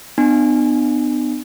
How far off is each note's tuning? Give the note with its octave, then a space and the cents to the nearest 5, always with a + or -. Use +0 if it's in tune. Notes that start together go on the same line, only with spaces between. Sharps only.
B3 +20 D4 +40 G#5 +0